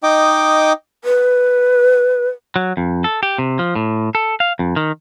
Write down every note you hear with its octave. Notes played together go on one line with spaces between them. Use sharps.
D#4 D#5 G5 D6
B4
F#3
F2
A4
G4
C3
F3
A2
A4
F5
F2
D#3